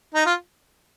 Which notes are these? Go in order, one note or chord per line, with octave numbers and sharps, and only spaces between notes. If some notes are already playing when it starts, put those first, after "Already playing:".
D#4
F4